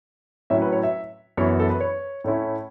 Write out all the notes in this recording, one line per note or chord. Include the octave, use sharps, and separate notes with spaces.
A2 F#3 C#4 E4 E5
B4
C#5
E5
F#2 E3 B3 E4 C#5
A4
B4
C#5
A2 A3 C#4 E4